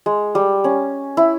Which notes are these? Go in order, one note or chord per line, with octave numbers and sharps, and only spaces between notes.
G#3
G3
C#4
E4